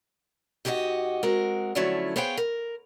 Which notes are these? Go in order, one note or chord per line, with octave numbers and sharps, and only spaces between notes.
G#2 F#4 G4 A4 D#5
G#3 C4 F#4 A#4
D3 F3 F#3 A3 C#4 E4
B3 G#4 C5 C#5 F5 G5
A#4